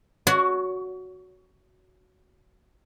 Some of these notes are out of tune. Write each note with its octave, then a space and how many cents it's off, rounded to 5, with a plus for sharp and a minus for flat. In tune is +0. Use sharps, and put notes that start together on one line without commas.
F#4 +0 C#5 +25